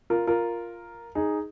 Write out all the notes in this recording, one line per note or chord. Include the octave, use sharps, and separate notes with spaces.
F4 A#4
F4 A#4
D#4 G#4